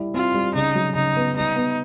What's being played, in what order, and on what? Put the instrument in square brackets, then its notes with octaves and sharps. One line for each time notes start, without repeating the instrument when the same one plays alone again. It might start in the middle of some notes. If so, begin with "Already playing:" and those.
Already playing: [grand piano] G3 E4
[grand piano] C4 [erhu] F4
[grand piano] G3
[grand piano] C#3 [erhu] D#4
[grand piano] F#3
[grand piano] C#3 [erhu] D#4
[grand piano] B3
[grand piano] G3 [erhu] D#4
[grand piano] B3